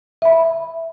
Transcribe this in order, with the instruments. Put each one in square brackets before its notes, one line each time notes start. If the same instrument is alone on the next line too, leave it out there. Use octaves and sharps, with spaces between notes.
[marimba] E5 B5